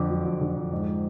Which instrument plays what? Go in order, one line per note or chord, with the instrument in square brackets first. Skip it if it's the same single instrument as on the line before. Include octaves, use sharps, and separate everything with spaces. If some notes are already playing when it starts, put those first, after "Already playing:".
Already playing: [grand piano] F2 D3 D6
F#3
F2
D3
F2
G#2